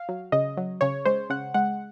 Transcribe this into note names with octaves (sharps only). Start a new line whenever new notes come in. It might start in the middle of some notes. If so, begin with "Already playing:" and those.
Already playing: F5
F#3
C#3 D#5
F#3
C#3 C#5
G#3 C5
C#3 F#5
G#3 F#5